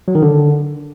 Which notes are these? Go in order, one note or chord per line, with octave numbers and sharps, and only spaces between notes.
F#3
D#3
D3